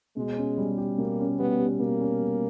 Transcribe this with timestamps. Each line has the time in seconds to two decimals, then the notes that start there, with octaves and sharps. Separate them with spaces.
0.17 B2 G#3
0.37 C#4
0.57 G3
0.78 G4
0.98 B2 A#3
1.19 C#4
1.39 G3 B3
1.59 G4
1.80 B2 A#3
2.01 C#4
2.21 G3